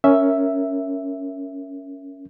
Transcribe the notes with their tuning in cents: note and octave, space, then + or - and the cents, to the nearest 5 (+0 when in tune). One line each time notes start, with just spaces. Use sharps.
C#4 +5 A#4 +0 E5 +0